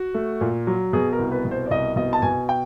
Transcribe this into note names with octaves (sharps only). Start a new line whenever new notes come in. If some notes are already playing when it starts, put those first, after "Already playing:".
Already playing: F#4
A3
A#2
F#3
B2 G#4
A#4
C2
B4
B2
C5
D5
C2 D#5
B2 D#5
A5
B2 G#5
G5